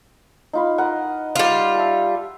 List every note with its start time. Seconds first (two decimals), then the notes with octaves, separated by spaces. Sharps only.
0.53 D#4 F4 B5
0.78 A#4 D#5 F#5
1.36 G3 F4
1.75 E5 A5